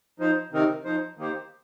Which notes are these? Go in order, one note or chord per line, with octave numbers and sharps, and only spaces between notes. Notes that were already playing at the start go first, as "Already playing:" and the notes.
F3 D#4 C5
C3 D#3 C4 D#4 A#4
F3 D#4 C5
D#3 A#3 D#4 G4 C5